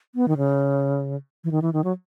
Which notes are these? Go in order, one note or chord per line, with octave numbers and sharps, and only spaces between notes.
B3
D#3
C#3
E3
D#3
E3
D#3
F#3